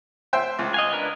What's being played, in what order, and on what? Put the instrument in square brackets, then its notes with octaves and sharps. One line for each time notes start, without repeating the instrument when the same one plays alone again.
[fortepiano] C5 E5 G5
C#2
[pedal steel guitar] D#5 F5 G#5
D4 A#4 B4